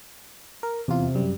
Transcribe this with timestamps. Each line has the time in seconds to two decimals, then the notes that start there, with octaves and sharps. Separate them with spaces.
0.63 A#4
0.88 E2 C3 F4
1.15 F#2 G3